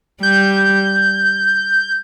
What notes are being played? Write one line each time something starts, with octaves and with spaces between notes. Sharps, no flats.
G3 G6